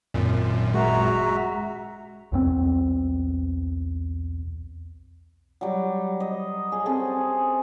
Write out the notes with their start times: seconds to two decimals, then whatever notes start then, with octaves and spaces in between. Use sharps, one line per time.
0.14 G#1 F#2 A#2
0.74 G#3 F#4 E5 A#5
2.32 B1 E2 C4
5.61 F#3 G3
6.20 D#5
6.72 G#4 D#5
6.86 C4 C#4 G#4 A4